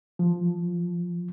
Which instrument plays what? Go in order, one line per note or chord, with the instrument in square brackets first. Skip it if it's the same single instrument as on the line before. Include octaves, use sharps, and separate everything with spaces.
[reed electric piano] F3